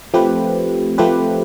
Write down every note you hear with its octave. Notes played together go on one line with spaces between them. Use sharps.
F3 A3 C4 G4 B4
F3 A3 C4 G4 B4